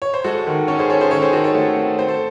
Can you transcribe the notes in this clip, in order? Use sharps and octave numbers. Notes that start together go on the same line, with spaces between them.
C#5
C5
G#3 F#4 A4
D#3
C#4 A4 C#5
G#4 C5
C#4 A4 C#5
G#4 C5
D#3 A4 C#5
G#4 C5
D#3 F#4 A4
A4 C#5
A3
C4
C4 C5
A4